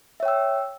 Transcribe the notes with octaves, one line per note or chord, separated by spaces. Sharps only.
C#5 E5 G5 E6